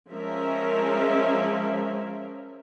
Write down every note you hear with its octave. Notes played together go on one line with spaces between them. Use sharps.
F3 G#3 C#4 A#4 E5